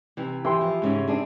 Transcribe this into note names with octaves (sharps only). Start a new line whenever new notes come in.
C3 E3
E3 G4 G5 C6
F3
G#2 C#3 C#4
C4 D4 G#4